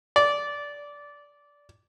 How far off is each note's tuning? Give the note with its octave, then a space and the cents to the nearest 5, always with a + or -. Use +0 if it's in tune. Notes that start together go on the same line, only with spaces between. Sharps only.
D5 -15